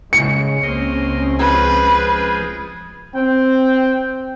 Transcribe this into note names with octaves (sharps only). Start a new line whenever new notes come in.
C#3 G#3 C#4 C#7
C#2 A#3 C4 C#4 D#5 C6
F3 G#3 G#4 B4
C4 G5